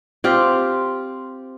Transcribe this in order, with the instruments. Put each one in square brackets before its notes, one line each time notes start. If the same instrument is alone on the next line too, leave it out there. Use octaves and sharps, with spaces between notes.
[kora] C4 F4 G4